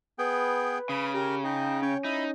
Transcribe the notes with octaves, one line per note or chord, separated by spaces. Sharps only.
B3 G#4 B4 G5
C#3 B5 D#6
G4 A#4
D#4 G5
C#4 C#5 G5
D#4 E4 B5